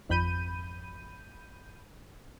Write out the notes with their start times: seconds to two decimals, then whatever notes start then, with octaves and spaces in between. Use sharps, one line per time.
0.09 G#1 F2 B5 G6 D#7